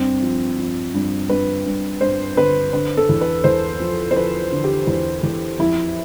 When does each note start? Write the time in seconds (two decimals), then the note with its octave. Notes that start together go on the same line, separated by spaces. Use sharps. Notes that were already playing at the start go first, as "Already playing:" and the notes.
Already playing: G2 C4
0.22 F3
0.58 F3
0.94 G2
1.30 G2 B4
1.66 G2
2.01 G2 C5
2.37 D3 B4
2.73 D3 B4
2.97 A4
3.09 E2
3.21 B4
3.44 E2 C5
3.80 F3
4.11 C5
4.15 F3 B4
4.52 D3
4.64 G4
4.87 E2
5.23 E2
5.59 F2 E4